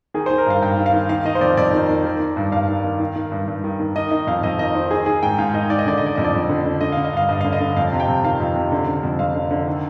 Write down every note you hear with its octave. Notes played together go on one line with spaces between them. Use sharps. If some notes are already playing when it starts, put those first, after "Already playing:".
D#3 G#4
D#3 C5
A#4
G2 F5
G2 G5
D#3
F5
D#3
D#3 F5
D#3 D#5
C5
F2 D5
F2 D5
D#3
D#3
D#3
D#3
G2
G2 F5
D#3
D#3
D#3
D#3
G2
G2
D#3
D#3
D#3 D#5
D#3 D#5
F2 F5
F2 D#5
D#3 D#5
D#3 C5
D#3 G#4
D#3 G#4
G#2 G5
G#2 F5
D#3 D#5
D#3 D5
D#5
D3 D5
D#5
D3 D5
F2 D#5
D5
F2
D3
D3
D3 D#5
D3 F5
D#5
G2 F5
G2 D#5
D3 F5
D#5
D3
F2 F5
C3
G5
F2
D#3 F5
F2
C3
D3
D3
F2
F2 F5
D3
D3
D#3